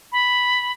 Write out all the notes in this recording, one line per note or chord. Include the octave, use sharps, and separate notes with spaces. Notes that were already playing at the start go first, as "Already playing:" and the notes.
B5